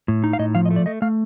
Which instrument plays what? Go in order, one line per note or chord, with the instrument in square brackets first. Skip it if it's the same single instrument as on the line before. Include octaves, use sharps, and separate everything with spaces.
[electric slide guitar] A2
D#4
F5
A2 D#5
F3 F5
D#5
A3
D5
A3 D#5
A3 F5